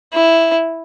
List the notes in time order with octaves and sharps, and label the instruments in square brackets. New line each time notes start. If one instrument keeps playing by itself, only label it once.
[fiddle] E4